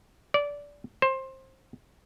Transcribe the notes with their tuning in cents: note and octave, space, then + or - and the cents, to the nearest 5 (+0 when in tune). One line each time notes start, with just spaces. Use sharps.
D5 -20
C5 +20